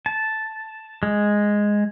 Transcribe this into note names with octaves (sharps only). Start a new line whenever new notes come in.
A5
G#3